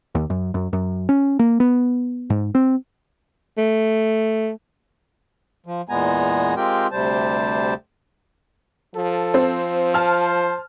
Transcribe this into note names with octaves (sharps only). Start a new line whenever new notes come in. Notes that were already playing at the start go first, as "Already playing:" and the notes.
D#2
F#2
F#2
F#2
C#4
A#3
B3
G#2
C4
A3
F3
E2 A#2 G#3 B3 G#5 A#5
G#3 C4 F4 G4 A#4 G5
D2 C3 G3 C5 A5
F3 A4
C4
C5 A5 F6